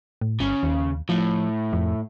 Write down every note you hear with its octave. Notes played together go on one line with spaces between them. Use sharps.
A2
G1 C#3
D#2
A2 F3
F2